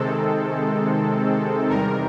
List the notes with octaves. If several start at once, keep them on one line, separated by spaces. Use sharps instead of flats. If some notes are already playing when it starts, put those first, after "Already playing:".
Already playing: C3 D#3 G#3 C4 A4
E2 C3 D#3 G3 A#4